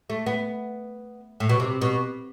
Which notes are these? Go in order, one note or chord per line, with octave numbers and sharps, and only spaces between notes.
A3
B3
A2
B2
C3
B2